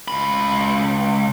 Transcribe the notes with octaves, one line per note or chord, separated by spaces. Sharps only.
C#2 B5